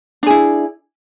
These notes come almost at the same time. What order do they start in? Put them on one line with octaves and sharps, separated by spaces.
D4 G#4 E4